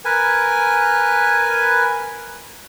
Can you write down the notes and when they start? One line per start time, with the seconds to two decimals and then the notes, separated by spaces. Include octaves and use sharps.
0.05 A#4 B4 G#5